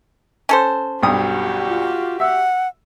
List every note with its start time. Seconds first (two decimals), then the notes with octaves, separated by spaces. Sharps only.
0.49 C#4 A4 C5
1.03 B1 G2 F#4 G4 D#6
1.68 F4
2.20 E5 F#5 E6